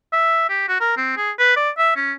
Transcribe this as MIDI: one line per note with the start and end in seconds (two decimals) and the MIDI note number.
0.13 0.48 76
0.49 0.68 67
0.68 0.80 66
0.80 0.93 70
0.97 1.12 60
1.17 1.31 68
1.39 1.56 71
1.56 1.70 74
1.78 1.92 76
1.96 2.12 61